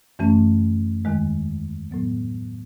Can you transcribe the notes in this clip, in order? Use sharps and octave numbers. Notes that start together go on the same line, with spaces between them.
F#2 E3 A3 C#4
E2 D#3 G#3
A2 F#3 B3